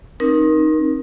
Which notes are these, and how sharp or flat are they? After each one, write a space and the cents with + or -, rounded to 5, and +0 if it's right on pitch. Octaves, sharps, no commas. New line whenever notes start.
C4 +40 D#4 +0 A#4 +25